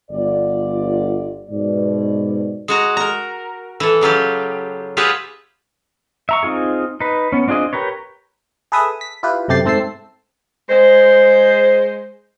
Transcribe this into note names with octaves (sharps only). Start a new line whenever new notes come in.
G1 F4 D5
G#2 B2 D5
G#3 F#4 A#5
A#4 A#5
E3 A4
C#3 F#3 F4 G4
F4 G4 G#4 B4 E5 F#5
E5 A#5 C#6
C4 D#4 F4 G#4
D#4 B4
B3 C#4
C4 D4 F4 G#4 D#5
G4 A#4 B4 C#5
G#4 A4 B4 E5 D#6
B6
E4 F4 G4 B4
F#2 C3 A3 G4 A6 C7
G#2 A3 C4 A5 E6 C7
G#3 C5